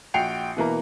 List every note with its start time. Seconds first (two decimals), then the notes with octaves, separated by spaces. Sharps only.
0.14 A#1 F#4 G5 C7 C#7 F7
0.57 B2 E3 A#3 A#5